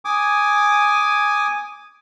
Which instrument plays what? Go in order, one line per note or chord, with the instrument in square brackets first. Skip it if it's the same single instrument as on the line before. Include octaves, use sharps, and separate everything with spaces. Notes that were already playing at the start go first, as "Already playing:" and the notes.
[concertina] G#5 D6 D#6